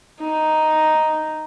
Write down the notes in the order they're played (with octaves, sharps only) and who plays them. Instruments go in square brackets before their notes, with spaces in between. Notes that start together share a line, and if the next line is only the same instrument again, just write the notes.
[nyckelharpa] D#4